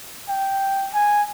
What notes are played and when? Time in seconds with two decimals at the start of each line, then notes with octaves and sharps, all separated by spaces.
0.29 G5
0.94 G#5